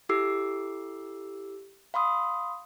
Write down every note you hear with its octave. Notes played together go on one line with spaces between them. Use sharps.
E4 G4 A4 D6 E6 C7
F5 B5 C6 D#6